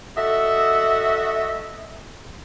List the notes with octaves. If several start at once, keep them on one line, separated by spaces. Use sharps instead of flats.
F#4 A4 D#5 E5